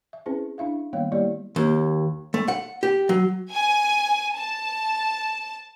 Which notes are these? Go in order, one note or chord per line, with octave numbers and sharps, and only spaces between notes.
E5
C4 C#4 E4 G#4 B4 C5
D4 E4 E5 F5
D#3 G3 A#3 B3 C#5 F5
G3 A#3 E4 G4 C#5 D5
D#2
A3
F#5
G4
F#3
G#5
A5